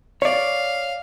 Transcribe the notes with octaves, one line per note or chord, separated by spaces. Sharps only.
C#5 D5 F5